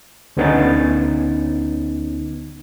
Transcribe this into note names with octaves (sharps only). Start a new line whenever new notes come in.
D2 D3 B3 C#4 D#4 A6